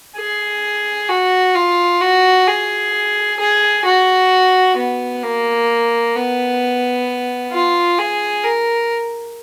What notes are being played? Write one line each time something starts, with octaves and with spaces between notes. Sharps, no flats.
G#4
F#4
F4
F#4
G#4
G#4
F#4
B3
A#3
B3
F4
G#4
A#4